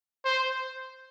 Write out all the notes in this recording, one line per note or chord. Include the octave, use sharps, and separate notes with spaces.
C5